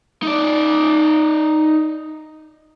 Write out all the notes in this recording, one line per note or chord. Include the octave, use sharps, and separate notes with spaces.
D#4 D5